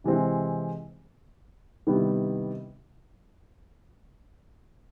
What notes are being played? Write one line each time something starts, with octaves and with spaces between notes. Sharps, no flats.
C3 E3 G#3 C4
C3 D#3 G3 B3 E4